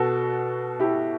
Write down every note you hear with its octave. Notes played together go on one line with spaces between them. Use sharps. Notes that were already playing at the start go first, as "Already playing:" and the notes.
Already playing: B2 F#4 A4
E4 G4